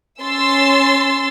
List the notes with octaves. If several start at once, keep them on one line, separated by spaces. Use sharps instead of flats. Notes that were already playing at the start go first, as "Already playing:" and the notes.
C#4 C6 E6 A6